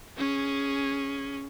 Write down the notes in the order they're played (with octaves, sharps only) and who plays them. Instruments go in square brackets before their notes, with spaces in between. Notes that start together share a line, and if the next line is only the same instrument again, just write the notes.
[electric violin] C#4 G#4